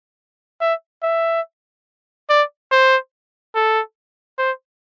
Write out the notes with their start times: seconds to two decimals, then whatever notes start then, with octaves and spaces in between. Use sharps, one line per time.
0.61 E5
1.03 E5
2.30 D5
2.72 C5
3.55 A4
4.39 C5